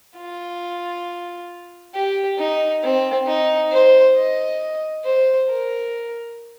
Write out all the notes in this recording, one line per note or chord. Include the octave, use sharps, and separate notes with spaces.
F4
G4
D#4
C4
D#4
C5
D#5
C5
A#4